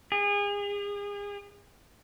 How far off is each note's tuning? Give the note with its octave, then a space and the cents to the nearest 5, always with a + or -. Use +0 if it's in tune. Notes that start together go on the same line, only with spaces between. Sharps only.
G#4 -35